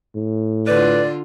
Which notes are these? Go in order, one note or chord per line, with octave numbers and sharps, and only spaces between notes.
A2
D3 F4 B4 D5